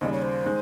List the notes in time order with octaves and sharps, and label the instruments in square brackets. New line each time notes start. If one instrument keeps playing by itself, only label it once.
[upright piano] D#2 C#3 G3 [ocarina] D#5
[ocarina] C#5
C5
[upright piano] D#3 G#3